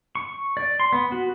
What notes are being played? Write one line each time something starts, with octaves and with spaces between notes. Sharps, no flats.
C#6
D5
C6
B3
F#4